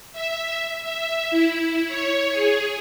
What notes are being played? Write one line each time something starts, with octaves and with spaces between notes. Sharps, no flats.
E5
E5
E4
C#5
G#4